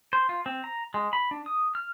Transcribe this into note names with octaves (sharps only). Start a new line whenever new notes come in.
C5
F4
C4
A#5
G#3
B5
D4
D#6
F6